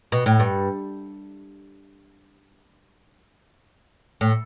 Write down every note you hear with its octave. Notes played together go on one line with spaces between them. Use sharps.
B2
A2
G2
A2